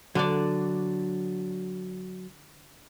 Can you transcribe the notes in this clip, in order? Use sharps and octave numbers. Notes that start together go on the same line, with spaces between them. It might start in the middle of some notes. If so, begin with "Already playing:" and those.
D3 F#3 D4 D5